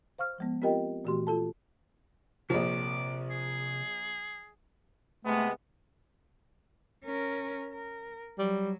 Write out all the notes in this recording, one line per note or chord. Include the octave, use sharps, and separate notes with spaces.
C5 F5 C#6 F6
F3 G#3 B3
C4 F4 G4 A#4 D#5 G5
A#2 E3 A3 F#4 G4 C6
F4 A4 A5
A#1 C3 F3 A#4 C#5 D6
G#4
C3 G#3 A3 B3
C#4 A#4
A#4
F#3 G3